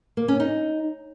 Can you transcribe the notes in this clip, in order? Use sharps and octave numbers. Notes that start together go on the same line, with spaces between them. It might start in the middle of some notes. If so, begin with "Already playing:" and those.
A#3
C#4
D#4